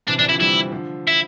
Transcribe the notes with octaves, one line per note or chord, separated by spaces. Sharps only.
C3 E3 D4
C3 E3 D4
D3 F3 E4
E3 G3 E4
D3 F3
E4